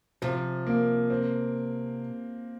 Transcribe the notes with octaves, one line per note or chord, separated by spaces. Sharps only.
C3 F3
A#3
C4